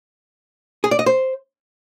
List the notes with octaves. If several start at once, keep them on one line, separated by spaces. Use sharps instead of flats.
G#4
D5
D#5
C5